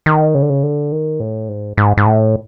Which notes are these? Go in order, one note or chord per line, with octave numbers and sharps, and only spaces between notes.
D#3
C#3
D3
C#3
D3
D#3
A2
G#2
G#2
G#2
A2